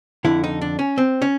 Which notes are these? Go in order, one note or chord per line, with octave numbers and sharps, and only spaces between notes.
F2 D3 E4
D#4
D4
C#4
C4
C#4